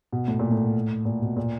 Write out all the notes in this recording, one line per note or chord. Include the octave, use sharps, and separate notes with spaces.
B2
A2
A#2
A2
A#2
B2
A#2